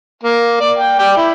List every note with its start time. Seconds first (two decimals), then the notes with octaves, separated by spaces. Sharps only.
0.23 A#3
0.61 D5
0.78 G5
0.99 D5 G5
1.17 E4